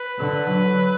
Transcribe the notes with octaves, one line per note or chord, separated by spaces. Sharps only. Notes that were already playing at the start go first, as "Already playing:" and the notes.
Already playing: B4
D3
F#3